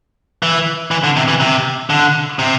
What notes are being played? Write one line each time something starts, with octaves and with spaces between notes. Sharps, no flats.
E3
E3
D3
C3
E3
C3
D3
C3